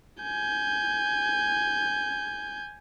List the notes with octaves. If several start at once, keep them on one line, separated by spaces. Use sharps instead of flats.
G#5 G6